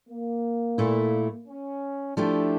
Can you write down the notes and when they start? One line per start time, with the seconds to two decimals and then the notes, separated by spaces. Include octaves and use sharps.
0.08 A#3
0.78 A#2 A3 E4
1.48 C#4
2.17 F3 A3 D4 E4 G4